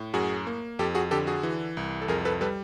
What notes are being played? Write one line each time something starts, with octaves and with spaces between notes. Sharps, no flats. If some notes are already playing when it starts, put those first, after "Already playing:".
Already playing: A2
F#2 F#4 G#4
A#3
F2 G4 A4
F#4 G#4
D3 G4 A4
F#4 G#4
E3
C2
A4
F2 G#4 A#4
A4 B4
G3 A4 B4